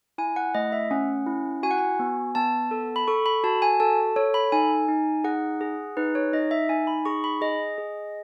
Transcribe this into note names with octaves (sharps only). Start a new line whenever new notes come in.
E4 G#5
F#5
A3 D#5
E5
C#4 F#5
E4
F#4 G#5
F#5
G#5
B3
B3 A5
A4
B5
A4 C#6
B5
F#4 A5
G#5
A4 A5
A4 C#5
B5
D#4 G#5
D#4
G#4 F#5
G#4
D#4 B4
C#5
D#4 D#5
E5
D#4 G#5
B5
G#4 C#6
B5
G#4 D#5
G#4